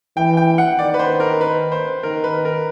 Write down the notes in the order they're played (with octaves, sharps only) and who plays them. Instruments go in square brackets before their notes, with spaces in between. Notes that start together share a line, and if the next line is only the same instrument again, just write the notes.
[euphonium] E3 [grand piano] G5
[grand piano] G5
F#5
[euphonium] D#3 [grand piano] D5
[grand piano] B4
C5
A#4
B4
C5
[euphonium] D#3 [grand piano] A#4
[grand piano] B4
A#4